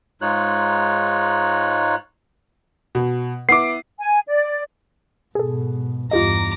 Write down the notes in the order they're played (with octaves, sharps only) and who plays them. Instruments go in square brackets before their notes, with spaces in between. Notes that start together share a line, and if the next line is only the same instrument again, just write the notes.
[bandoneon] G#2 G#3 D#4 F4 C#5 F#6
[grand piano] B2
[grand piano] B3 E4 [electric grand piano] D6 C7
[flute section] G#5
D5
[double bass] G#2 B2 [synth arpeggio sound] G#4 A4
[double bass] E2 G2 [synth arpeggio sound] F4 G4 D#5 [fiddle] A#5 D6